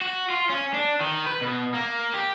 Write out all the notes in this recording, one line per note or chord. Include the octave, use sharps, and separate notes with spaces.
F#4
F4
C#4
D4
D#3
B4
B2
A#3
G4